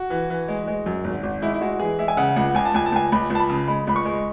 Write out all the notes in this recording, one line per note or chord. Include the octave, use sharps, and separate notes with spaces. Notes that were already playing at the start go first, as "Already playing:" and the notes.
Already playing: F#4
E3
E3
G#3
G#3
F#2
G#1
G#1
G#3 E4
E4
G#3 F#4
E3 G#4
G#3 E5
G#5
C#3 F#5
C#2 F#5
C#2 G#5
A5
C#2 G#5
A5
C#2 G#5
C#2 B5
C#2
A5
B5
C#3
G#3 B5
C#2 B5
C#6
G#3